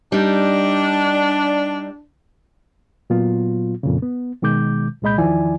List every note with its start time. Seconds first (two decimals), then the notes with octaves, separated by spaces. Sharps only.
0.12 G3 D4 D#4
3.10 A#2 F#3 B3 F4
3.83 F2 A#2 C#3
4.03 B3
4.42 B2 D#3 G#3 D6 G6
5.02 C2 A#2 G#3 D#5 B5 G6
5.18 E2 D#3 F3 E4 D5 G#5